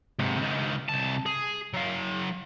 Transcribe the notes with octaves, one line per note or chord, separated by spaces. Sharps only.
G#2 C3
C#2 D#3
C2 A5
G#4
F#3 F5